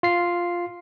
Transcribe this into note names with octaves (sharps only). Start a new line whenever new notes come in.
F4 C7